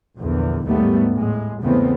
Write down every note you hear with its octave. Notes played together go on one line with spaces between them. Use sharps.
A#1 E2 D3
A1 D#2 G#2 G3 A3 B3
A2 G#3
E2 G#2 C#3 A3 B3 C4